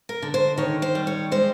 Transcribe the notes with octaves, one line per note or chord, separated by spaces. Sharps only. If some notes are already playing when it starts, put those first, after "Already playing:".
A#4
D3
C5
D#3 C#5
C5
G3
C#5
G#3 C5